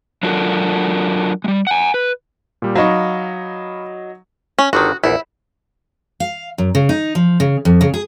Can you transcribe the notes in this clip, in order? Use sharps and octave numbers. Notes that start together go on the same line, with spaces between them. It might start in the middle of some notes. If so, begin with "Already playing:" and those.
F#3 D4 F4 F#4 A4 A#4
G3 G#3
F#5 G#5
B4
A#2 G3
F#3 D#4 F5 B5 C#6
C#4
G1 D3 D#3 F#4
A#1 E2 E4
F5
F#2
C#3
D#4
F3
C#3
F2
C#3
G#4